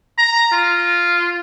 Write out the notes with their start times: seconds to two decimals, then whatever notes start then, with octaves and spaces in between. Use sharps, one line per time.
0.18 A#5
0.52 F4